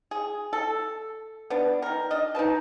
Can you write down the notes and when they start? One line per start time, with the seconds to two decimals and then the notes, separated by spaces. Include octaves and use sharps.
0.11 G#4
0.53 A4
1.50 B3 D4
1.82 D#3 A#4
2.11 D4 D#5
2.35 D#4 A#4 B4 A5